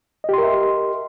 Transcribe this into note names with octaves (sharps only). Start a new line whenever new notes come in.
G4 A#4 D#5 E5 C6